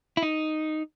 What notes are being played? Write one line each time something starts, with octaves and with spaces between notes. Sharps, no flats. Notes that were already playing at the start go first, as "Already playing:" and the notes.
E4
D#4